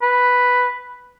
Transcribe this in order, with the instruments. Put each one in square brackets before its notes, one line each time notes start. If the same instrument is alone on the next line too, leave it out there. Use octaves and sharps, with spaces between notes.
[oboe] B4